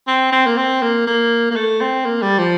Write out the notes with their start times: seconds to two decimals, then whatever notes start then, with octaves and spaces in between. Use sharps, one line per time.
0.07 C4
0.32 C4
0.46 A#3
0.57 C4
0.82 A#3
1.07 A#3
1.51 A#3
1.56 A3
1.81 C4
2.05 A#3
2.22 G3
2.39 F3